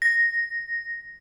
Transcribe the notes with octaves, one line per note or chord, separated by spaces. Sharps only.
A#6